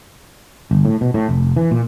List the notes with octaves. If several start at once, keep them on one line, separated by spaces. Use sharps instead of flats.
G1
A2
B2
A2
F1
E3
A#2